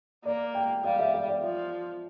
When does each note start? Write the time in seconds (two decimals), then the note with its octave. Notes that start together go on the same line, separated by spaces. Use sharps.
0.25 A#3 D5
0.54 G5
0.84 G3 F5
0.99 E5
1.14 E5
1.28 D5
1.44 F3 D5